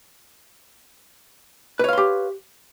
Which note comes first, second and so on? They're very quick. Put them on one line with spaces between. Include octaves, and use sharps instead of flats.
B4 C#5 F5 C6 G4